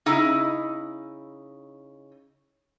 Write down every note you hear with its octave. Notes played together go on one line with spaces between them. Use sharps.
C#3 D#4 E4 D#5